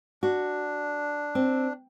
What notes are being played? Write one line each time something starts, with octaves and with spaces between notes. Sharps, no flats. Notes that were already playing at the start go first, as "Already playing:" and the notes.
D4 F#4
C4